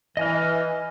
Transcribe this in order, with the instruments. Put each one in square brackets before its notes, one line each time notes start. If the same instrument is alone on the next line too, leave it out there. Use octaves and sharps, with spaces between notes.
[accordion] E3 [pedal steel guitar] D#5 G#5 F6